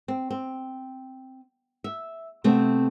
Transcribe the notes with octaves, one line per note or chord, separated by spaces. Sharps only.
C4
C4
E5
C3 A3 B3 C4